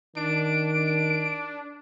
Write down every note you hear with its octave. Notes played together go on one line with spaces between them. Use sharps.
D#3 D4 D7
D4